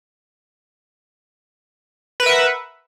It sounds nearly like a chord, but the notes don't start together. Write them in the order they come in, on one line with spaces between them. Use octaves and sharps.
B4 A#4 E5 F#5